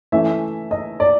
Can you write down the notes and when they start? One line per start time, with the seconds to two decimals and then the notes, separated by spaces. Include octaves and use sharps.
0.12 E3 A3 C#4 E5
0.71 D#5
1.00 D5